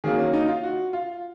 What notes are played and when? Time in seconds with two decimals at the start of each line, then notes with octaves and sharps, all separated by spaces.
0.04 D#3 F#3 A#3 G#4
0.19 C#4
0.33 D#4
0.48 F4
0.63 F#4
0.93 F4